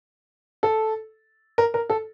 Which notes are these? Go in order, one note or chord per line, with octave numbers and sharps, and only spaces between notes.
A4
A#4
A#4
A4